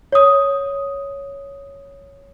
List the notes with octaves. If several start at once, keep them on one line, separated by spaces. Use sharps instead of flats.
C#5 D#6